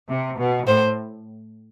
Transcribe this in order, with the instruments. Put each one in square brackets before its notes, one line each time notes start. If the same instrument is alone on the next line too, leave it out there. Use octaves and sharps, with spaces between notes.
[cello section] C3
B2
[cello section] A2 [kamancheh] C5